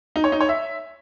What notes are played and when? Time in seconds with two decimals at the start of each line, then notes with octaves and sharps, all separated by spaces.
0.16 D#4
0.24 C#5
0.32 D#4
0.41 C#5
0.49 E5